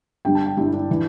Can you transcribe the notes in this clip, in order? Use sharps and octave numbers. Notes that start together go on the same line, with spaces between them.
G1 G2 G3 G5
A5
G5
G1 G2 G3 E4
D4
E3